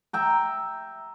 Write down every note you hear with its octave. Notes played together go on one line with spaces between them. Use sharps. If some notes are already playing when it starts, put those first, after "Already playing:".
E5 G5 A#5